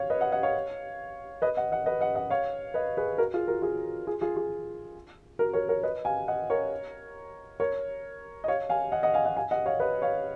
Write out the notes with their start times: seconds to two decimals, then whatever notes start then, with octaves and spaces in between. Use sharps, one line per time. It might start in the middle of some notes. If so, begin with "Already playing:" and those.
Already playing: C#5 F5
0.10 B4 D#5
0.21 D#5 F#5
0.32 D#5 F#5
0.43 C#5 F5
1.42 B4 D#5
1.57 D#5 F#5
1.72 D#5 F#5
1.86 B4 D#5
2.01 D#5 F#5
2.15 D#5 F#5
2.30 C#5 F5
2.74 B4 D#5
2.97 G#4 B4
3.18 F#4 A#4
3.34 F4 G#4
3.48 F#4 A#4
3.62 F4 G#4
4.07 F4 G#4
4.21 F4 G#4
4.37 F4 G#4
5.39 F#4 A#4
5.53 A#4 C#5
5.69 A#4 C#5
5.83 B4 D#5
6.05 F5 G#5
6.28 D#5 F#5
6.50 A#4 C#5
7.60 A#4 C#5
8.44 D#5
8.48 C#5 F5
8.69 F5 G#5
8.92 D#5 F#5
9.03 D#5 F#5
9.14 F5 G#5
9.25 D#5 F#5
9.37 F5 G#5
9.51 D#5 F#5
9.66 C#5 F5
9.80 B4 D#5
10.02 C#5 F5